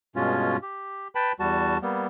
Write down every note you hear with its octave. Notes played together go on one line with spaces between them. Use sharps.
G2 B2 G#3 C#4 F4
G4
B4 G5 A5 B5
E2 G3 F#4 A5
G3 A#3 B3